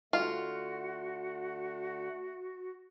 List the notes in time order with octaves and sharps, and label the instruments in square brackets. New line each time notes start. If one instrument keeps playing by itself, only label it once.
[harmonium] D3 A3 [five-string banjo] F4 [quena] F#4